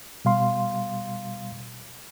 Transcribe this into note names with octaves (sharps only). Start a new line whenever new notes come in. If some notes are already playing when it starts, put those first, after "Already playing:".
B2 G3 F5 C6